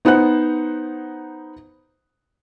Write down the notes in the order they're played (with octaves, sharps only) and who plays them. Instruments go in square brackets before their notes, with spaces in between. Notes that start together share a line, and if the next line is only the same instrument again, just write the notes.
[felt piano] B3 D#4 C5 F#5 F#6